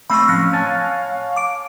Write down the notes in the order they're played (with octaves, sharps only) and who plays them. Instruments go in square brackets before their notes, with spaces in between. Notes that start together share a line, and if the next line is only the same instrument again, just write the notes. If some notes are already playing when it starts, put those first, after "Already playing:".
[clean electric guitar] A3 C4 D#5 [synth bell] B5 C#6 [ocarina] E6
[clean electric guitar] A2 F3 C#4 [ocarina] F5 [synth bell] F6 F#6 A#6
[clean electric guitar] C#5 G#5 A5
[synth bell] D6 D7